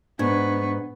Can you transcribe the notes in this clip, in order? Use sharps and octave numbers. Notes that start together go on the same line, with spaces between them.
G#2 B3 D4 C#6 G#6